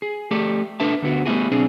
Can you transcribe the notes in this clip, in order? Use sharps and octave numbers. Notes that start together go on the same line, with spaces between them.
G#4
A3 G4 A4 D5
D4 A4 B4 E5 A5
D2 D3 B3 F#4
G3 A3 B3 E4 F#4 G#4
B1 C4 D4 G#4